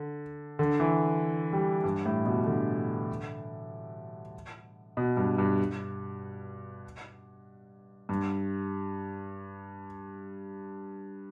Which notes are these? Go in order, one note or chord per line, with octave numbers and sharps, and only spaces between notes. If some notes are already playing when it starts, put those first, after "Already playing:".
Already playing: D3
D3
E3
G3
G2
A2
B2
D3
B2
G2
G2
G2